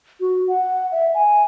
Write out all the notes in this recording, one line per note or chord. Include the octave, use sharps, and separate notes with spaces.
F#4
F#5
E5
G#5